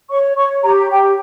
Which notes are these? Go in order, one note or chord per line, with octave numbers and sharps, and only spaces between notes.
C#5 C#6
C#5 C#6
G4 A#5
G4 G5